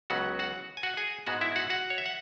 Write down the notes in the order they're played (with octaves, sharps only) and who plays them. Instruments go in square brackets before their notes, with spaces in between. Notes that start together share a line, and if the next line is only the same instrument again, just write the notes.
[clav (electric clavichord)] C#2 C#3 F#3 B3 F#4 F#5
F#4 F#5
G#5
F#4 F#5
G#4 G#5
G#2 G#3 B3 F#4 F#5
E4 E5
F#4 F#5
F#4 F#5
C#5
E5
F#5